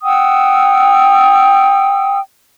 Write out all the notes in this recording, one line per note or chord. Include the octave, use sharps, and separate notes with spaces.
F#5 G5 D#6 E6